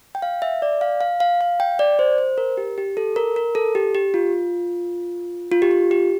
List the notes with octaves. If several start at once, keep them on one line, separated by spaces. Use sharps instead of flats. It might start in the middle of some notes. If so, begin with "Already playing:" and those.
G5
F5
E5
D5
F5
F5
F5
F5
G5
D5
C5
C5
A#4
G4
G4
A4
A#4
A#4
A4
G4
G4
F4
F4
G4
F4
G4